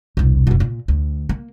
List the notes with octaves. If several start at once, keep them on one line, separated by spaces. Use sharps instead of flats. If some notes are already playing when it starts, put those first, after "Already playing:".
E1 C2
F1 B2
A#2
D2
A#3